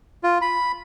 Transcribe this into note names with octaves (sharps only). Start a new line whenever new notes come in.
F4
B5